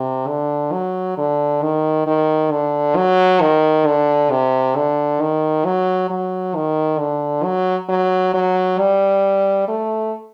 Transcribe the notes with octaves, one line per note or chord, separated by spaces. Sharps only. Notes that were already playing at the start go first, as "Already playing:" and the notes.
Already playing: C3
D3
F#3
D3
D#3
D#3
D3
F#3
D#3
D3
C3
D3
D#3
F#3
F#3
D#3
D3
F#3
F#3
F#3
G3
A3